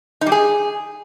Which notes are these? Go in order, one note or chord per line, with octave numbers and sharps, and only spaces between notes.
D#4
G3
G#4